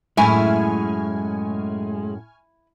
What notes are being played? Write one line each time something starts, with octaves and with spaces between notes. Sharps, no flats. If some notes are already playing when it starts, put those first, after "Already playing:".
F#2 A2 G#3 A3 E4 G#5 C#6 F6